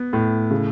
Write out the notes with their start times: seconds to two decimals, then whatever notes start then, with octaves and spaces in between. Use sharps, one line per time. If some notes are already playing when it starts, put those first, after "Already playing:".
Already playing: B3
0.13 A2
0.51 C#3